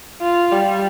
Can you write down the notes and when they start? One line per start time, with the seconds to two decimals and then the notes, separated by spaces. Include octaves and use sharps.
0.22 F4
0.52 G3